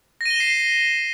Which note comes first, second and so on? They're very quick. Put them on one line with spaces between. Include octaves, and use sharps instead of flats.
A#6 D#7 G7 E7 C7